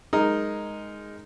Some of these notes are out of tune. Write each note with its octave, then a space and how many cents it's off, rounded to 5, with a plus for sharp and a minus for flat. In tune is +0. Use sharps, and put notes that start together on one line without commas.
G#3 +0 D#4 +0 A#4 +0